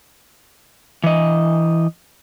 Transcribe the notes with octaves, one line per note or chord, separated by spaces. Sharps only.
E3 D#5